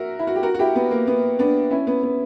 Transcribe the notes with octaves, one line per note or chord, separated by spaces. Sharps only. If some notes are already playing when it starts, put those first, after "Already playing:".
Already playing: F#4 A#4 E5
E4
F#4
G4
F#4 A#4
F#4
E4 G4
B3
A#3
B3
B3 D4
C#4 E4
B3
B3